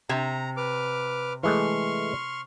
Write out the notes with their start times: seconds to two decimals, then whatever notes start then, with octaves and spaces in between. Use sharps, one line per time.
0.09 C3 A#5
0.57 B4 D6 F6
1.43 E3 G#3 A3 C6 C#6 F6